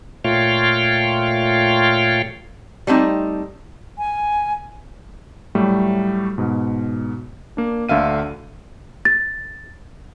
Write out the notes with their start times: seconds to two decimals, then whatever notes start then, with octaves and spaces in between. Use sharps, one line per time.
0.24 A#2 A3 F4 C#5 F5 G5
2.87 G3 A3 C4 D#4
3.98 G#5
5.55 A2 F#3 G3 A3
6.38 G#2 B2
7.57 A#3 D4
7.89 D2 D3 E5 F5 D#7
9.05 A6